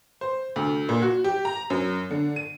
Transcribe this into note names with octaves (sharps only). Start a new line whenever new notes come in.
C5
D2
A#2
F#4
G4
A#5
F#2
D3
D#7